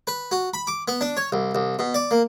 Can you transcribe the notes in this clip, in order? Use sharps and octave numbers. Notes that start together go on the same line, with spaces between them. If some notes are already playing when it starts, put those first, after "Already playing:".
B4
F#4
B5
D6
B3
D4
C#5
C2
C2
B2
D5
A#3